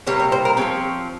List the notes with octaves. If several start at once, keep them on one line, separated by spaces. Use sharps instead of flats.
C3 G3 A#3 C#5
C#5
C5
A#4
F3 G#3 C4 C#5